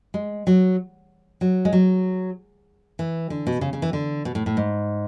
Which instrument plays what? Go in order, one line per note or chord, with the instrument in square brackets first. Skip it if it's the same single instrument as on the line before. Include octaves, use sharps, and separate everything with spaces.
[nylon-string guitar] G#3
F#3
F#3
G#3
F#3
E3
D3
B2
C#3
C#3
E3
D3
B2
A2
A2
G#2